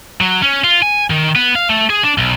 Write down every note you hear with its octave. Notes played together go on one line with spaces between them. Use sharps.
F#3
C#4
F4
G#5
D#3
B3
F5
A3
G#4
D4
B1